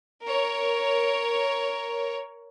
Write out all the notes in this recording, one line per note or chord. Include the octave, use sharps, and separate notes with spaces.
A#4 C#5